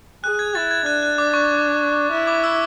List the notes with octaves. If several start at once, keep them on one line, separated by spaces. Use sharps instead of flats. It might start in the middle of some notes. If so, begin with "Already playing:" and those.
G#4 F#6
G#6
E4 A6
G#6
D4 F#6
F#6
D6
C#6
E4
D6
E6